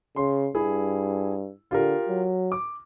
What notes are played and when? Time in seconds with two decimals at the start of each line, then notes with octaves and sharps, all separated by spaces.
0.16 C#3 C6
0.55 G2 E4 G#4
1.71 D3 F4 G4 A#4
2.08 F#3
2.52 D6